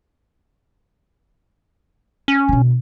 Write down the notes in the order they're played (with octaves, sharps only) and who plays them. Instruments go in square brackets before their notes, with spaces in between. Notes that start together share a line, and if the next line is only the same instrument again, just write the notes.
[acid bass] C#4
[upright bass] B2 D3